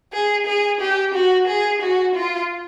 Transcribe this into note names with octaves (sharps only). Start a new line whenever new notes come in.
G#4
G#4
G4
F#4
G#4
F#4
F4